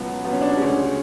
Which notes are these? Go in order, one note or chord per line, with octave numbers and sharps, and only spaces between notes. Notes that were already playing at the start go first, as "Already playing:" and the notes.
Already playing: C#2 B2 F#3 B3
C#2 B2 F#3 B3
C#4
D4
D2 C#3 G#3 C#4